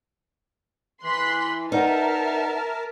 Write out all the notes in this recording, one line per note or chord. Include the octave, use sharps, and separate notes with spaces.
E3 C6 F#6 B6
D#4 A#4 B4 D5 E5 F#5 A5 F6